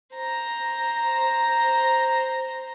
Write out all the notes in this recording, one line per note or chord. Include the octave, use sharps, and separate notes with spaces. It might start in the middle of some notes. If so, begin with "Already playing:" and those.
C5 A#5